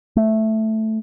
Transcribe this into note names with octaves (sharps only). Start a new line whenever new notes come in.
A3